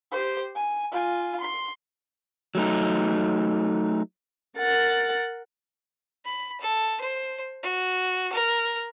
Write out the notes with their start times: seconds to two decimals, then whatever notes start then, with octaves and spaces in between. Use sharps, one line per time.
0.12 G4 C5
0.55 G#5
0.92 F4 G#5
1.40 C6
2.55 F#3 A3 D#4
4.56 A#4 F#5 A6
6.25 B5
6.61 A4
7.01 C5
7.63 F#4
8.33 A#4